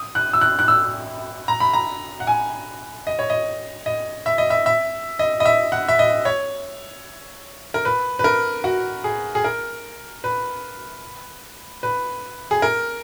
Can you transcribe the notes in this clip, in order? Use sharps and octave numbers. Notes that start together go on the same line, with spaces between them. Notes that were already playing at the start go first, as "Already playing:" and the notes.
Already playing: D#6
F#6
E6
F#6
F#6
E6
A#5
B5
A#5
F#5
G#5
D#5
C#5
D#5
D#5
E5
D#5
E5
E5
D#5
D#5
E5
F#5
E5
D#5
C#5
A#4
B4
B4
A#4
F#4
G#4
G#4
A#4
B4
B4
G#4
A#4